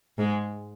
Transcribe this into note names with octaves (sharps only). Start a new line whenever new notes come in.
G#2 G#3